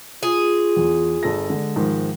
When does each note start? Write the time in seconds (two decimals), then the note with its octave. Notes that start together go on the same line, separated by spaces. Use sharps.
0.23 F4 G#4
0.76 E2
1.23 G1 A4 A#6
1.50 D3 G#3
1.76 G#2 D#3 F3